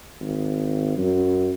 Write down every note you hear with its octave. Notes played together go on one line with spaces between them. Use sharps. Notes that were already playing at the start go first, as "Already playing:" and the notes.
G#1
F#2